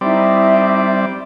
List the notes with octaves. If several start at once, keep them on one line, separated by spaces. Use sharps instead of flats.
G3 C4 D#4 E4 D5 E5